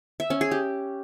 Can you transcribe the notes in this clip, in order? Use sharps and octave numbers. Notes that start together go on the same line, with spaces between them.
E5
C#4
G#4
G4